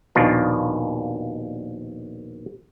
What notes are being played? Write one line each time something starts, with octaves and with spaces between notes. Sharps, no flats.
A#1 D#2 B2 D#3 D4 F4